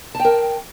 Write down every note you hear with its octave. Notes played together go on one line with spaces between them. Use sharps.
A#4 G5 A5